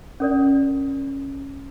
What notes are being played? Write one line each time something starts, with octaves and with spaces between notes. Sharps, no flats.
C#4 A#4 D5